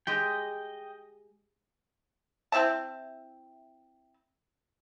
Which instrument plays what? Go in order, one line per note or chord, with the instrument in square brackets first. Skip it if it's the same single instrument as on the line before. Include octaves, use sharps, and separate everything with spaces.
[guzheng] G#3 G4 [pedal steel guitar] D#5 G5
[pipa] C4 E4 E5 A5